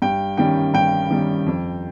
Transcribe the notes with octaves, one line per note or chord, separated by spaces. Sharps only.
G2 G5
D#3 G3 C#4 G5
G2 G5
D#3 G3 C#4
F2